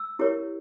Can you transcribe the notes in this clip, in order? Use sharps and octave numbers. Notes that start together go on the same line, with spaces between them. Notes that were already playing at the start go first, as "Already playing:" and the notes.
Already playing: E6
E4 G4 A#4 C#5